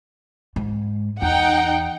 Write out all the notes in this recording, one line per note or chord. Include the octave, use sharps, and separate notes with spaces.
G#2
E2 D#4 F#5 G5